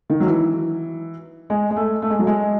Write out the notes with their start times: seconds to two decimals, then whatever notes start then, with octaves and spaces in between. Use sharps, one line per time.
0.10 D#3
0.20 F#3
0.27 E3
1.50 G#3
1.70 G#3
1.76 A3
2.02 A3
2.10 G#3
2.19 F#3
2.27 G#3